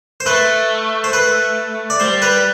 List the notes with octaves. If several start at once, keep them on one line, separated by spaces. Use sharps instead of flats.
C5
A3 B4
C5
B4
D5
G3 C5
B4